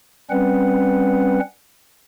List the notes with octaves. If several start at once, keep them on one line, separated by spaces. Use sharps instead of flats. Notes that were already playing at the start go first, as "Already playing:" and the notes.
G3 C4 C#4 B4 F#5